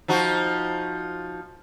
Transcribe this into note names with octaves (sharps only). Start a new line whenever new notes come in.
F3 D#4 F#4